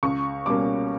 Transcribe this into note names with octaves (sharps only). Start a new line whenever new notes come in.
C#2 C#6
B2 G3 A#3 C#4 D6